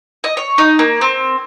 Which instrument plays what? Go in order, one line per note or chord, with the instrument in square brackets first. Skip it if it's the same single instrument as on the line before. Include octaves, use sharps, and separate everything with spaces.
[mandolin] D#5
C#5
D#4
A#3
C4